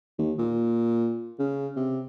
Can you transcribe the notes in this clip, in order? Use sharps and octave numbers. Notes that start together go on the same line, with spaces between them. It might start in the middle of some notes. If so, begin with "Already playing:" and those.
D#2
A#2
C#3
C3